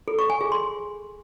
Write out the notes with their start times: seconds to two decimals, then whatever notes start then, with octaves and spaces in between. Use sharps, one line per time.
0.08 A4
0.19 C#6
0.30 G#5
0.41 G#4
0.52 C6